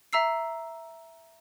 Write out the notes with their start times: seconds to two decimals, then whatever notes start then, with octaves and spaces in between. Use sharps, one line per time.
0.13 E5 A#5 E6 C7